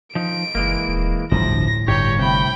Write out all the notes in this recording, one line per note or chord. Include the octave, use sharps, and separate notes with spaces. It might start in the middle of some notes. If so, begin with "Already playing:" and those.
F3 D#4 D7
F#1 E3 G#3 A#3
D#1
G1 D2 A2 C3 F3 A#6
G1 G2 G4 C#5 G5
A2 C3 G5 B5